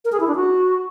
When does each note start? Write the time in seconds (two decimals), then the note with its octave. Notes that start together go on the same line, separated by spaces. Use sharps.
0.05 A#4
0.12 G#4
0.20 E4
0.28 D4
0.35 F#4